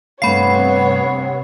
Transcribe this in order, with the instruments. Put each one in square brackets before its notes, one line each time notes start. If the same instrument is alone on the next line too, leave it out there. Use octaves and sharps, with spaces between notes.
[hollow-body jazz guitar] G2 A3 F5 [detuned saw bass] C3 [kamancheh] B3 C#5 [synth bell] B5 C7